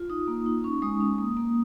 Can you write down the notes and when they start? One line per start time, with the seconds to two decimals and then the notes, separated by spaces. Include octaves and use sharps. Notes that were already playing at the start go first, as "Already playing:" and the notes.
Already playing: F4
0.10 D#4 D#6
0.28 A#3
0.46 D#4
0.64 C#4 C#6
0.82 G#3 D#6
1.00 C#4
1.18 A#3 D#6
1.37 A#3